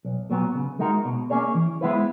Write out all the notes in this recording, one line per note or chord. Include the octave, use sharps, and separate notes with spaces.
B1
A#2 F#3 B3
C#3
G#3 D#4 F#4 A#4
B2
A#3 C#4 G#4 C#5
E3
G#3 B3 E4 B4